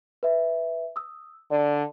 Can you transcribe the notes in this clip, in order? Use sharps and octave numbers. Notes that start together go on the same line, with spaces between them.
B4 E5
D#6 E6
D3 D5